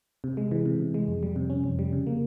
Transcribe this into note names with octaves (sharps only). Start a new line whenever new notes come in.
C3
G#3
E3
C3
C3
G#3
F2
G3
C3
C#4
F2
G3
C#3
A#3